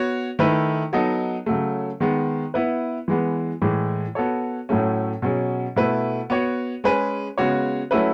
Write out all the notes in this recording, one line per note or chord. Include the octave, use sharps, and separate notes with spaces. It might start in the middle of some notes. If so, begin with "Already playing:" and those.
Already playing: B3 F#4 C#5
D#3 A3 E4 B4
F#3 B3 D#4 A4 D#5
C#3 F#3 A3
D#3 G#3 B3
B3 E4 B4
E3 G#3 B3
A2 E3 G#3
B3 F#4 A4 C#5
A2 F#3 A3 C#4
B2 F#3 C#4 G#4
B2 A3 E4 B4
B3 F#4 C#5
G#3 C#4 G#4 B4
C#3 G#3 B3 F#4 C#5
F#3 A3 C#4 E4 B4